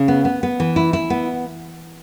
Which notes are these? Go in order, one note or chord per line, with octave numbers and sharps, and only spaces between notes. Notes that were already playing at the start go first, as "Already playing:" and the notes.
Already playing: C#3
B3
B3
B3
E3
E4
E4
B3